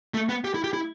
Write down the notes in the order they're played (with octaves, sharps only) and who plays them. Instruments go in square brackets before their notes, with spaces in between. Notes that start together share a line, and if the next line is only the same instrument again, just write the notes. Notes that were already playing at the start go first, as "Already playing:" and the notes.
[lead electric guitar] A3
B3
G4
E4
G4
E4